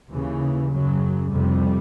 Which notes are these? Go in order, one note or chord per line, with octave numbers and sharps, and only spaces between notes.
D#2 C#3 E3
F#2 C#3 F#3
F2 C3 G3